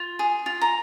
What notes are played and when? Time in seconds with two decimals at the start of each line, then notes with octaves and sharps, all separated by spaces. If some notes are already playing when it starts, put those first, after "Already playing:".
Already playing: F4
0.19 G#4
0.46 F4
0.62 A#5